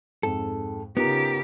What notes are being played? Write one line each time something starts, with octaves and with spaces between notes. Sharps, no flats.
F2 G#2 A4
C#3 B3 D#4 F4 G4 A#4